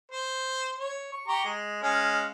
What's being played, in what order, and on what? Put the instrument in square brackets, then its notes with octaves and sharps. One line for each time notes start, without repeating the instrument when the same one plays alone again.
[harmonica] C5
C#5
C#6
G4 A#5 C#6
G#3
G#3 C#4 F5